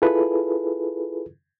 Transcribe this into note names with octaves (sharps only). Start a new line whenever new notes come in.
E4 F4 G#4 A4 B4